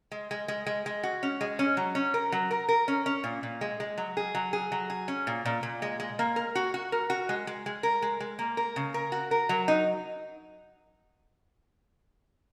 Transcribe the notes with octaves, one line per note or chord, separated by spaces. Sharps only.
G#3
G#3
G#3
G#3
G#3
F#4
C#4
G#3
C#4
F#3
C#4
A#4
F#3
A#4
A#4
C#4
C#4
A#2
A#2
G#3
G#3
F#3
G#4
F#3
G#4
F#3
G#4
C#4
A#2
A#2
A#2
G#3
G#3
A#3
A#4
F#4
F#4
A#4
F#4
G#3
G#3
G#3
A#4
G#3
G#3
A#3
A#4
C#3
A#4
F#4
A#4
F#3
D#4